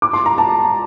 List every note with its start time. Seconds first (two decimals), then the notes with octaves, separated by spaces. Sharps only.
0.02 D6
0.13 C6
0.26 A#5
0.38 A5